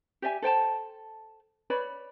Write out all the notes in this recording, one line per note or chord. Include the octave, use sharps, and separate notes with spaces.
G4 D5 E5 G#5
A4 C5 G5 A5
B4 C#5 D5 B5